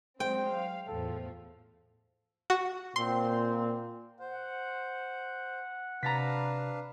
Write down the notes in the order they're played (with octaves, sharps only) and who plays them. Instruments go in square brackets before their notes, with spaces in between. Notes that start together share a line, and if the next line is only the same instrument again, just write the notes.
[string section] F#3 G#3 C4 [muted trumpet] C5 [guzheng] G5
[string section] F5
[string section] E2 A2 F3 [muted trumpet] A4
[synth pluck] F#4
[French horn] A#2 [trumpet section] C4 [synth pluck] C6
[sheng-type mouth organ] C5 [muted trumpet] F#5
[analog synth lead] C3 [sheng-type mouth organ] D4 B4 F5 [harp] A#5 A6 B6